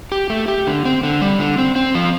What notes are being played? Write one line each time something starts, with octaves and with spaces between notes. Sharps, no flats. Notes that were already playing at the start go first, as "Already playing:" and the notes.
G4
A3
G4
D3
C4
D3
G3
D3
C4
C4
F3